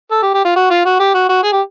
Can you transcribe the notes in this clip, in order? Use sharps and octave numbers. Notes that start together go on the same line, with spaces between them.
A4
G4
G4
F4
F#4
F4
F#4
G4
F#4
F#4
G#4
G4